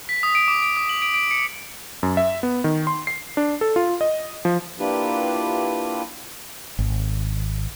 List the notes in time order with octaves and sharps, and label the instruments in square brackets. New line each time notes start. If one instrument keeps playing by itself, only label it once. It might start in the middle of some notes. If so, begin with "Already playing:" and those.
[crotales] B6
D#6
D7
D6
D7
D#6
F#7
D7
D7
C#7
[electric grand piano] F#2
E5
B3
D#3
C6
C7
D4
A4
F4
D#5
F3
[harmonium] A#3 D4 E4 F4 G4 B4
[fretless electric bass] G#1